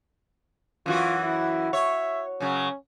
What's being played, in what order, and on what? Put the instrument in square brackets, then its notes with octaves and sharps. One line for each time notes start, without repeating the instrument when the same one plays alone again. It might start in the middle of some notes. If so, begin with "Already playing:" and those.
[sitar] F#2 E3 F#4 [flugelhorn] F4
[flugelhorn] E4
[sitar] C#5 [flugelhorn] E5
[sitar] F#2 C#3 F#3 [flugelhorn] C#4